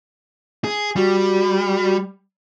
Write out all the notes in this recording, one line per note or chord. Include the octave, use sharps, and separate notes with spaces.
G#4
G3 F#4